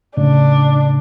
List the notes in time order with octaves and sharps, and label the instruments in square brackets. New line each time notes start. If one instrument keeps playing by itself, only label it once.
[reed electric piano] A2 C#3 [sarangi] D4